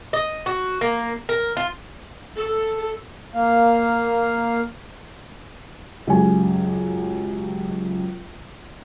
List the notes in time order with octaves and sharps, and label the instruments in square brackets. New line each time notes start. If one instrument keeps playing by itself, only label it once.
[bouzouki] D#5
F#4
A#3
A#4
F4
[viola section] A4
[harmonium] A#3 F5
[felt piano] C#2 F#2 G4 G#5